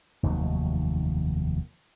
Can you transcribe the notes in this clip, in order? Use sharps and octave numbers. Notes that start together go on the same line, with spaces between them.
F1 D#2 D#3 F#3